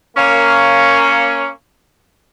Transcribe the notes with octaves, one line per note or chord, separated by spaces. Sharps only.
A#3 C#4